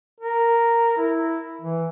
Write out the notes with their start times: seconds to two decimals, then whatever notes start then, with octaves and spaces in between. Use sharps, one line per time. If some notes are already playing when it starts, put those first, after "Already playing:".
0.21 A#4
0.97 E4
1.62 E3